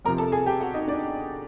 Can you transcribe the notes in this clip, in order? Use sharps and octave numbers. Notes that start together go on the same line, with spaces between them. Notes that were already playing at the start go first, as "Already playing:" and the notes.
F2 C3 F3 A#4 A#5
A4 A5
G#4 G#5
G4 G5
F#4 F#5
D#4 D#5
D4 D5